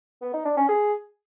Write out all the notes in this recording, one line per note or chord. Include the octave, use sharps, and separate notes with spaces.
B3
D#4
D4
C#4
G#4